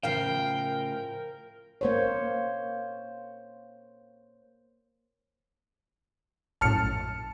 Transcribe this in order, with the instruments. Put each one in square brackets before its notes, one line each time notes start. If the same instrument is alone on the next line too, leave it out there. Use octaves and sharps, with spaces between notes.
[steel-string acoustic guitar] A2 C#3 F3 [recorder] A#4 [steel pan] F5 [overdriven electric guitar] G5
[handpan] A#3 C5 C#5
[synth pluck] A#1 F#2 A2 [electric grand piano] A5 F6 C#7